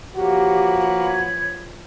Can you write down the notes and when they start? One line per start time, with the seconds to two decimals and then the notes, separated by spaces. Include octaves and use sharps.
0.15 F3 A#3 F#4 G4 B4 C#5
1.06 G#6